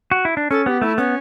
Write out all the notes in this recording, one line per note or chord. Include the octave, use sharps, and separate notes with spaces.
F#4
E4
D4
C#4 A4
B3 G4
A3 E4
B3 C#4